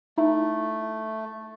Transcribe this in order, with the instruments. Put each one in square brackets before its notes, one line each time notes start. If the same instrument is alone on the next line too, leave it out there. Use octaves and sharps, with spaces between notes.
[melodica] A3 [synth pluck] D#4 E4 E5